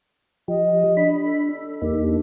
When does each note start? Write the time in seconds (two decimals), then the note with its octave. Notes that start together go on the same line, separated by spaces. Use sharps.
0.48 F3 G4 D#5
0.97 D4 B5
1.23 A4
1.82 E2 A#3 D#4 G4
2.01 D4